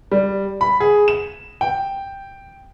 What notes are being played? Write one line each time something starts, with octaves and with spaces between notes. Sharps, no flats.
G3
B5
G#4
E7
G5